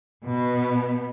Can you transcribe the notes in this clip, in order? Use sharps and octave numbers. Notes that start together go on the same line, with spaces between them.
B2 B3